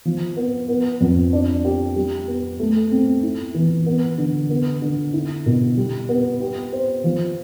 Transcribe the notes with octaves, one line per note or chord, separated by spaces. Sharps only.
F3
B3
B3
F2
D4
G4
G3
B3
A3
C4
E4
E3
B3
D3
B3
D3
E4
B2
G3
B3
G4
C5
F3